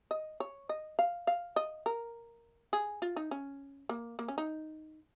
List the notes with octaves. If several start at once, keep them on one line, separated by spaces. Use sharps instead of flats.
D#5
C#5
D#5
F5
F5
D#5
A#4
G#4
F4
D#4
C#4
A#3
A#3
C#4
D#4